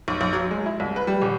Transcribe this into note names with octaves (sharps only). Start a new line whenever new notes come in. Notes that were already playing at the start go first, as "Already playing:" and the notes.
B1
B1
F#3
G#3
E4
C2
B4
G3
D#1